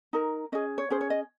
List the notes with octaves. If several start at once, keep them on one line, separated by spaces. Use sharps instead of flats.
D#4 A#4
C#4 G#4 D#5
C#5
C#4 G#4 C5
C#5
D#5